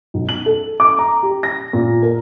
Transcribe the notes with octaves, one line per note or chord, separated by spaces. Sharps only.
B1
F#7
A4
D6
A#5
G4
A#6
A#2
A#4